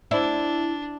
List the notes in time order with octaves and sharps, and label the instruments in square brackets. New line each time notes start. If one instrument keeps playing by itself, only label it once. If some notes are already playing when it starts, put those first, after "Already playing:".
[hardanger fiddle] D4 [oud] E4 [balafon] C5 D5